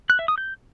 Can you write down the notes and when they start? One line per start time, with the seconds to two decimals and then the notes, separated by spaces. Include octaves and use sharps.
0.10 F#6
0.19 E5
0.28 D#6
0.38 G6